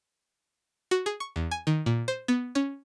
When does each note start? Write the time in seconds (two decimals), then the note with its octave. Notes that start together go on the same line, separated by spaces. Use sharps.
0.91 F#4
1.06 G#4
1.20 C#6
1.36 E2
1.51 G#5
1.67 D#3
1.86 A#2
2.08 C5
2.28 B3
2.55 C#4